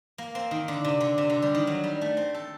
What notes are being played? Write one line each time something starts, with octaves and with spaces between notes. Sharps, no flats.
A#3
C4
D#3
D3
C3
D3
C3
D3
G3
D#3
F#3
G3
A3
C4
A4